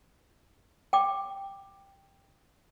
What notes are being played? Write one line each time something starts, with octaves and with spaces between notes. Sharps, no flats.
G5 D6